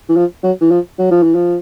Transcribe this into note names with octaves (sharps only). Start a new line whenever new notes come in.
E3
F3
F#3
E3
F3
F#3
F3
E3
F3